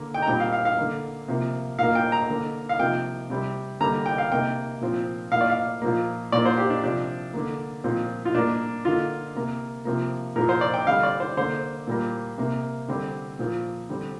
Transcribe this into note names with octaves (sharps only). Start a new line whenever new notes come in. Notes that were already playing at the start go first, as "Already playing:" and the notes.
Already playing: D3 A#3
G5
A#5
A#2 G3 C4 G5
F5
F5
F5
D3 A#3
C3 F3 A#3
A#2 A#3 F5
G5
A#5
D3 A#3
F5
C3 F3 A#3 G5
C3 G3 C4
D3 G3 A#3 A#5
G5
F5
C3 A#3 G5
A#2 F3 C4
A#2 A#3 F5
D5
F5
A#2 F3 A#3
A#2 A#3 D5
C5
G4
D4
C3 F3 C4 D4
D3 A#3
A#2 F3 C4
F4
A#2 A#3 D4
D3 A#3 F4
C3 A#3
C3 F3 A#3
A#2 F3 A#3 A#4
C5
D5
G5
D3 G3 C4 F5
D5
C5
D3 A#3 C5
A#2 G3 A#3
C3 A#3
D3 G3 C4
A#2 F3 A#3
D3 G3 C4